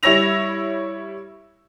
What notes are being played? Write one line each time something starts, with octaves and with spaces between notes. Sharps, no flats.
G3 E4 C#5 E6 A#6 F7